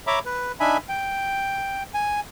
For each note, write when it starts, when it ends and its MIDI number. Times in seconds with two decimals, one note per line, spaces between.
0.07 0.19 73
0.07 0.19 76
0.07 0.19 82
0.07 0.19 83
0.07 0.19 86
0.26 0.52 71
0.60 0.77 62
0.60 0.77 63
0.60 0.77 76
0.60 0.77 80
0.60 0.77 83
0.89 1.83 79
1.94 2.20 80